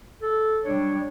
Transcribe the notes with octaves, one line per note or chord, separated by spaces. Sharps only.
A4
G3 D4 C#5